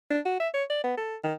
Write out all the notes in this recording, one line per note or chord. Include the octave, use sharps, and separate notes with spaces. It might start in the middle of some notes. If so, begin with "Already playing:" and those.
D4
F#4
E5
C#5
D5
B3
A4
D#3